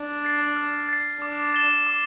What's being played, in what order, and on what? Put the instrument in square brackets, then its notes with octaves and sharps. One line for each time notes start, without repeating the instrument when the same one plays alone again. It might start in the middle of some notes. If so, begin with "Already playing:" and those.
Already playing: [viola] D4
[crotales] A6 C7
F6
A6 C7
[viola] D4 [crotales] D6
[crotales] A6 E7 G7
D6